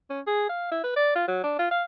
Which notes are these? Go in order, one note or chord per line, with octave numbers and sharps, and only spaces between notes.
C#4
G#4
F5
E4
B4
D5
F4
F#3
D4
F4
F5